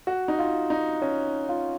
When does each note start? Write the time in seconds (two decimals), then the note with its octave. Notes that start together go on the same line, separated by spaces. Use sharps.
0.07 F#4
0.28 D#4
0.39 F4
0.70 D#4
1.02 C#4
1.49 F4